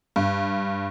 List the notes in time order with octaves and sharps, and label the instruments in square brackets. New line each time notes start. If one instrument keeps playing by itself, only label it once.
[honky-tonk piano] G2